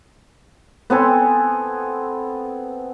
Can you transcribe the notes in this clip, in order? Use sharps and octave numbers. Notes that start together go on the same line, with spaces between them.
B3 C4 A4 G#5